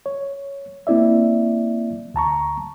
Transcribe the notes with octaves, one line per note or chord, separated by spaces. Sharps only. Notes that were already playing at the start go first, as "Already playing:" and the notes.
C#5
A#3 C4 E4 D5 E5
D2 A5 A#5 C#6